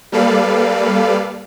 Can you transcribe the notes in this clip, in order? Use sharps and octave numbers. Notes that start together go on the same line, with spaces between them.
G3 A#3 A4 B4 D5 F5